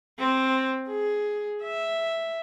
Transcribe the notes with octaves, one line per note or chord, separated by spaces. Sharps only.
C4
G#4
E5